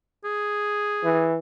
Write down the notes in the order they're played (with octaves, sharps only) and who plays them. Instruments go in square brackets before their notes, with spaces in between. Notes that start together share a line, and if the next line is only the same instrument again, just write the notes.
[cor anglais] G#4
[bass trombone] E3